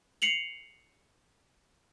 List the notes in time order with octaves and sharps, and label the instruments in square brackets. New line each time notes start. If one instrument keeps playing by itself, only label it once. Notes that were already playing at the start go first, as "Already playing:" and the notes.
[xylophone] C7 C#7 F7 F#7